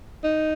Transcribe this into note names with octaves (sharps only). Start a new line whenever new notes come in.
D#4